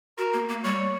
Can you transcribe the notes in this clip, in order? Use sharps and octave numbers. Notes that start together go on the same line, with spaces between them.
F#4 A#4
A#3
A#3
G3 C#5